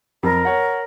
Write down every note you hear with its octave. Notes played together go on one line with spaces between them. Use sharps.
F2 A#4
C#5 F#5